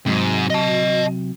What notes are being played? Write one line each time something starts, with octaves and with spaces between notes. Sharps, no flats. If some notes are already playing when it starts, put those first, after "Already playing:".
G#2 C3 F#3
D#5 A5